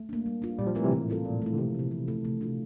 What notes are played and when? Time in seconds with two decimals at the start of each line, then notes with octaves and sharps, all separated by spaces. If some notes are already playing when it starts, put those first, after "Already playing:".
Already playing: A3
0.09 A#3 D4
0.26 G3
0.42 D4 F4
0.58 A#2 G3
0.67 F3
0.75 E3 A3 C4 F4 A#4
0.84 C3
0.92 A2 E3
1.08 G3 C4 F4 A4
1.25 A#2 F3
1.42 A3 E4
1.53 D3
1.58 C3 F3
1.75 A3 E4
1.91 E3
2.08 A3 E4 A4
2.25 A3
2.41 D4 F4